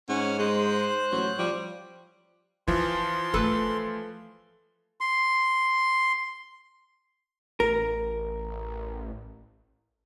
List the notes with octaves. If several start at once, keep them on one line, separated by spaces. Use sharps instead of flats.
G#2 C#4 F#5
G#3 C5 F#6
A1 F#3
F3 G3
E3 F3 F4 C6
A3 E4 A4 B4
C6
A1 A#4